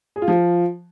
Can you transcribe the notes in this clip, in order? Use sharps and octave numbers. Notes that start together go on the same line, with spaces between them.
G#4
F4
F3